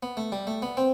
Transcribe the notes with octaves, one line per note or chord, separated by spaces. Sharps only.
B3
A3
G3
A3
B3
C4